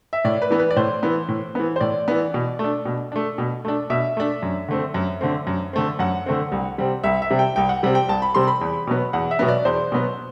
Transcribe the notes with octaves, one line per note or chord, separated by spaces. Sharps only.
E5
A2 D5
B4
E3 B3
B4
D5
A2 C5
E3 B3
A2
E3 B3
C5
A2 D5
E3 B3
B2
A3
D4
B2
A3 D4
B2
A3 D4
B2 E5
A3 D4
F#2
D3 A3 C4
F#2
D3 A3 C4
F#2
D3 A3 C4
F#2 F#5
D3 A3 C4
C2
C3 G3 C4
C2 E5
E5
C3 G3 C4
G5
C2 G5
F#5
C3 G3 C4
G5
C2 A5
B5
C3 G3 C4 C6
B5
E2
B2 F#3 B3
E2 F#5
E5
B2 F#3 B3
D5
E2 C5
B2 F#3 B3